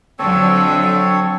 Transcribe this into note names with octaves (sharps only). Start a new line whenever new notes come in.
F2 D3 F#3 C4 A4 C#5